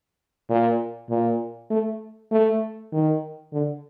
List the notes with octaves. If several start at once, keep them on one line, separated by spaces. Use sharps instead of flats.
A#2
A#2
A3
A3
D#3
D3